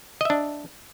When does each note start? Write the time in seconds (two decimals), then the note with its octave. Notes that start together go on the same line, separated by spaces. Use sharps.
0.21 D#5
0.25 E5
0.30 D4